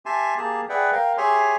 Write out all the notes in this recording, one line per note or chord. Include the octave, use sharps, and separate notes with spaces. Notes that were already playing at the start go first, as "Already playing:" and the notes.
G4 E5 G#5 A5 C6
A#3 G4 G#4 A5
G#4 B4 D5 E5 F#5 G5
A#4 F5 G5
G4 G#4 C#5 E5 G#5 C6